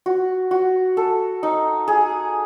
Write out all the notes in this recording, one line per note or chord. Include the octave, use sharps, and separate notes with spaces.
F#4
F#4
A4
D#4
G#4